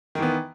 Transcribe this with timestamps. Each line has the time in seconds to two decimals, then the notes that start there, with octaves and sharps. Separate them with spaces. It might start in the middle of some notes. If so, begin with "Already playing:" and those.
0.15 D#3
0.19 E3
0.22 B3